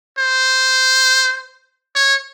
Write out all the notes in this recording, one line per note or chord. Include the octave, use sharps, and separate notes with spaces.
C5
C#5